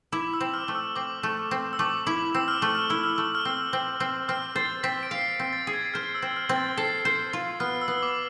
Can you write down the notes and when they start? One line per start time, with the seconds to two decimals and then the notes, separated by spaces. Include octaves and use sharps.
0.12 E4 D6
0.34 E6
0.41 C4
0.54 F6
0.68 A3
0.75 E6
0.96 C4 D6
1.23 A3
1.51 C4
1.73 E6
1.79 A3 D6
2.07 E4 D6
2.34 C4 E6
2.48 F6
2.62 A3 E6
2.75 F6
2.90 E4 E6
3.04 F6
3.16 A3 E6
3.35 F6
3.45 C4 E6
3.73 C4
4.00 C4
4.28 C4 F6
4.56 C5 A6
4.83 C4 B6
5.03 D7
5.11 F5 C7
5.40 C4
5.53 A6
5.67 G#4
5.74 G#6
5.94 C5 F6
6.15 E6
6.22 C4
6.36 F6
6.49 C4
6.56 A6
6.77 A4 C7
7.05 C5
7.33 F4
7.60 B3 F6
7.82 E6
7.88 B3
8.03 D6